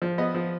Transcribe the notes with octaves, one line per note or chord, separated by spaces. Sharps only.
F3
B3 D#5
F3